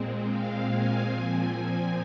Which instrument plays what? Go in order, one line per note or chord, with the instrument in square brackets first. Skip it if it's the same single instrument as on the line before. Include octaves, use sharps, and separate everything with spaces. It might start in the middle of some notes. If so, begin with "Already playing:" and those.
Already playing: [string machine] A#2 G#3 C4
F5
G#5
A#2 F3 C4